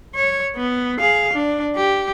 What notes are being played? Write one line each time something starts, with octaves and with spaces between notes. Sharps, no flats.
C#5
B3
G#4 F5
D4
G4